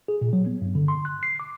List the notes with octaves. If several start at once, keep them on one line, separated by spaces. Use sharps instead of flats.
G#4
A#2
F#3
B3
G2
D3
C6
F#6
C7
D6